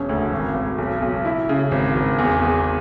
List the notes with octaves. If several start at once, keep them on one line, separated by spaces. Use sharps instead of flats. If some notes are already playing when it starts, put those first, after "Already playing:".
Already playing: E1 C#4
D2
G#1
G#1
B1
B1
E4
C#3
G#1
G#1
E2
E2